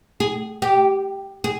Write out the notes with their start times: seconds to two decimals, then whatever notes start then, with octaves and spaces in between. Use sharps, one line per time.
0.20 G#4
0.62 G4
1.44 G#4